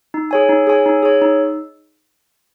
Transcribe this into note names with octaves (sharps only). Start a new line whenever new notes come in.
D#4
G#4 C#5 G#5
D#4
G#4 C#5 G#5
D#4
G#4 C#5
D#4